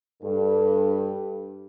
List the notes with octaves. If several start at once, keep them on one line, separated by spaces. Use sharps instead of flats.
G2 A4